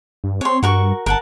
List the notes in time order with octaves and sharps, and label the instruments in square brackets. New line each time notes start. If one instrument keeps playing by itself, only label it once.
[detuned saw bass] G2
[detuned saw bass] C4 [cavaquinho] C#5 C6
[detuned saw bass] G2 [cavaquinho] F#4 A#4 C#6
[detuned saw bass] G1 [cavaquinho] A#4 F#5 A5